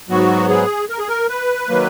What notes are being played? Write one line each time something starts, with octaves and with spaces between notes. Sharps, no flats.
G#2 F#3 B3 F#4
G#4
A#4
G#4
A#4
B4
D#3 F#3 A#3